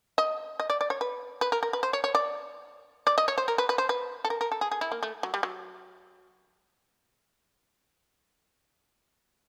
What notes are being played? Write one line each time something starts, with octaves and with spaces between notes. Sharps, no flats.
D#5
D#5
D5
D5
C#5
B4
B4
A#4
A#4
B4
C5
C#5
C#5
D5
D5
D#5
C#5
C5
A#4
B4
B4
C5
B4
A4
A#4
A#4
A4
G#4
G#4
E4
A#3
A3
F#3
G3
F#3